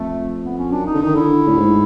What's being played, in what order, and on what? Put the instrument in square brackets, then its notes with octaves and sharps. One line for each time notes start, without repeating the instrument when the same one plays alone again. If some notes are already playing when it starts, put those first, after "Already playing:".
Already playing: [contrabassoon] F2 [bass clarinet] A3
[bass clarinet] B3
C#4
[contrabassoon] F#2 [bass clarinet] D4
[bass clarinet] D#4
[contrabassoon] D3
[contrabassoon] D#3 [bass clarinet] D#4
[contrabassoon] D3 [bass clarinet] E4
[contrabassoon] A2
G#2